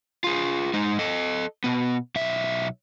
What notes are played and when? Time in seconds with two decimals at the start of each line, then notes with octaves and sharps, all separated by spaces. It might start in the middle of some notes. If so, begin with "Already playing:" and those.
0.24 F4 G#4
0.74 G#3 D#4
0.99 A4 D#5
1.64 B2 B3
2.15 B1 E5